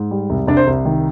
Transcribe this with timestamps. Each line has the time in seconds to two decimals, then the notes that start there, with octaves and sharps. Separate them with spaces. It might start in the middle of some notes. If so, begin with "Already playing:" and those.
Already playing: G#2
0.11 G3
0.30 C2
0.47 C2 D4 D5
0.57 C5
0.67 C2
0.85 D#3